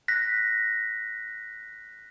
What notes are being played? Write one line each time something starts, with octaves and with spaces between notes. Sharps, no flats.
F#6 A#6 B6